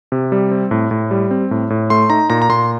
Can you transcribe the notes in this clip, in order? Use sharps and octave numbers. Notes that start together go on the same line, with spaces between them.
C3
G3
C4
A2
A2
G3
C4
A2
A2
A3 C6
D#4 A#5
A#2 A#5
A#5
A#2 C6